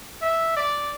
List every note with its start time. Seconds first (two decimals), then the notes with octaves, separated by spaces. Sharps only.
0.22 E5
0.56 D5